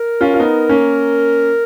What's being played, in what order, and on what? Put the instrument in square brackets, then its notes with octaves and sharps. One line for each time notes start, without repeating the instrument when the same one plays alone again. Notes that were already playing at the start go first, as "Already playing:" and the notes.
Already playing: [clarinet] A#4
[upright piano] C#4 F4
F4
B3 D#4
A#3 C#4